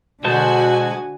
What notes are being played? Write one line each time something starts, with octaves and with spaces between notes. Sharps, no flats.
B2 D3 G#3 F#4 C5 G#5 A5